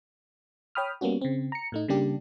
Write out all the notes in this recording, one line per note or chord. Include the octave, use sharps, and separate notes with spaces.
C#5 G5 B5 D#6 F6
G3 A#3 B3 C#4 F#4
C#3 C4
A#5 C#7
A2 A3 D#4
C#3 G3 A#3 D4 G4